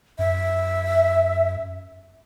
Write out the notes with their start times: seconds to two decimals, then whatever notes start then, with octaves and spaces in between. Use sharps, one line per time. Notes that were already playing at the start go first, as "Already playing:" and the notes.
0.19 F#2 E5